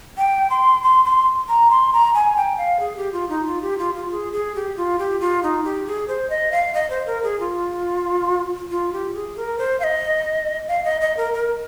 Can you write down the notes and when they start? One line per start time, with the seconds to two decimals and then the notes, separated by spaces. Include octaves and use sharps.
0.18 G5
0.50 C6
0.83 C6
1.05 C6
1.49 A#5
1.70 C6
1.93 A#5
2.14 G#5
2.36 G5
2.58 F5
2.80 G#4
2.97 G4
3.13 F4
3.29 D#4
3.46 F4
3.62 G4
3.79 F4
3.95 F4
4.11 G#4
4.33 G#4
4.55 G4
4.77 F4
4.99 G4
5.21 F4
5.43 D#4
5.64 G4
5.87 G#4
6.08 C5
6.30 D#5
6.52 F5
6.74 D#5
6.90 C5
7.07 A#4
7.23 G#4
7.40 F4
8.71 F4
8.93 G4
9.14 G#4
9.37 A#4
9.58 C5
9.80 F5
9.84 D#5
10.68 F5
10.84 D#5
11.01 D#5
11.17 A#4
11.34 A#4